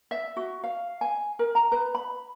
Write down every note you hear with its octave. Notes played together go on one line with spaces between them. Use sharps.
E5
F#4
F5
G#5
A#4
A#5
B4
B5